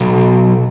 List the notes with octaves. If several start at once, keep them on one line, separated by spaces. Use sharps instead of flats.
B1